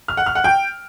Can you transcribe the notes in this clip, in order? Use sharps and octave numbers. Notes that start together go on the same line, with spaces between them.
F6
F#5
F6
F#5
G5